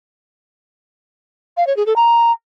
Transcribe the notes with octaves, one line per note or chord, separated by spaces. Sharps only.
F5
C#5
G#4
A4
A#5